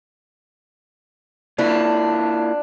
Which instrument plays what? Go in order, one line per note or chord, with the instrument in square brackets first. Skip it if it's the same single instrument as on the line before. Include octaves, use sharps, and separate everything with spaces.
[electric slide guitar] A#3 E4 F4 [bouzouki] D4